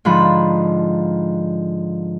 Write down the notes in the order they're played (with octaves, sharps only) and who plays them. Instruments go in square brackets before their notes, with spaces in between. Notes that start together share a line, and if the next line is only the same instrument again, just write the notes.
[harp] G#2 D3 F3 B5